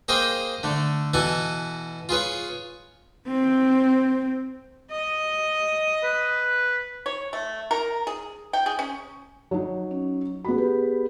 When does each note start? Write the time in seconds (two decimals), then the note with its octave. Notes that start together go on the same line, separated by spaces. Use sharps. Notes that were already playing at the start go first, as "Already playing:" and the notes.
0.08 A#3 G#4 A#4 C5 D#5 G5
0.63 D3 A3
1.13 B2 E3 E4 A4 G#5
2.09 F4 G#4 B4 C#5
3.27 C4
4.90 D#5
6.03 B4
7.06 C#5
7.33 A3
7.71 A#4
8.07 G#4
8.53 G5
8.66 G#4
8.79 C#4
9.51 F#3 D#4
9.91 C#4
10.45 B3 F#4 G#4 B5
10.58 G4 G#4 B4